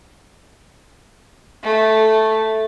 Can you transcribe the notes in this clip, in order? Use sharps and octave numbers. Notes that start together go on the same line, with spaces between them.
A3